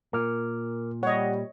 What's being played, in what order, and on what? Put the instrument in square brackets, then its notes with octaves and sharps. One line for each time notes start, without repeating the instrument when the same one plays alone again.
[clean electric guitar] A#2 [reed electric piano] A#4 D6 F6
[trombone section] G3 [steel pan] C#5 D#5 [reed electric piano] F#5